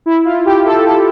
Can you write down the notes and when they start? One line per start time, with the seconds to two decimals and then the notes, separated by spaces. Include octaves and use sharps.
0.06 E4
0.25 F4
0.46 G4
0.66 A4
0.85 A4